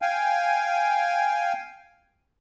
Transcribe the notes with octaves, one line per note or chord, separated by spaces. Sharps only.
F5 G5 G#5